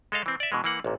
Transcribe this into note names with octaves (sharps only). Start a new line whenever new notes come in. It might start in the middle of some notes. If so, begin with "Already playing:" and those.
G#3 A4 D#5 F5
E3 C4
D5 E5
B2 E3 G#3
E3 A#3 F#5
A1 A#2